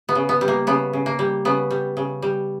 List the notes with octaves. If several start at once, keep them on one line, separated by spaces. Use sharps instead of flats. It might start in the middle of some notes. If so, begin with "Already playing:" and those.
B3
C#3
B3
G3
A#3
C#3 B3
C#3
A#3
G3
C#3 B3
G3
C#3
G3